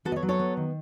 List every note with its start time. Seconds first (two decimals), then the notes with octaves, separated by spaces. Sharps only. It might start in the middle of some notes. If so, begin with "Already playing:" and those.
0.05 B3 F#4 A4
0.12 D#5
0.16 A4 C#5
0.22 F#3
0.29 A4 C#5
0.39 B3
0.57 D#3